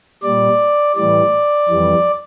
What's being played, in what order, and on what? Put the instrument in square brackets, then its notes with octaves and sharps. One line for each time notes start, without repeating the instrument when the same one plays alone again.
[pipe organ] A#2 G3 D5
A2 E3 G3 D5
F2 E3 G3